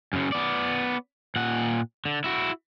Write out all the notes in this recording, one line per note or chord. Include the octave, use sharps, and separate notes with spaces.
F#2 C#3
B3 D5
A#2 F#5
D3
E4 F#4